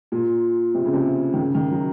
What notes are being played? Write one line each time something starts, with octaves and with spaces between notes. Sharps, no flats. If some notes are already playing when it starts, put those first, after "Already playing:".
A#2
C3
C#3
C3
D#3
C#3
D#3
F#3